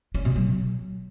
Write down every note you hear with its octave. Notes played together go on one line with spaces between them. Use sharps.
C#4
B2
F#3